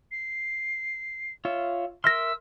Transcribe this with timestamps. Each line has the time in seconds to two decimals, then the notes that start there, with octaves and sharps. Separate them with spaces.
0.11 C7
1.45 F4 C#5 E5
2.04 A#4 E5 C6 E6 F6 A#6